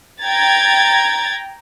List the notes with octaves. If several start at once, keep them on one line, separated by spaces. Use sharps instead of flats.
G5 A#5 G#6 A6